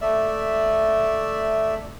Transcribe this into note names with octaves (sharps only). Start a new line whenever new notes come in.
A3 D5 E5